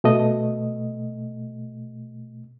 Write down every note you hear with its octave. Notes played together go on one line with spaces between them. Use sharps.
B2 A3 D#5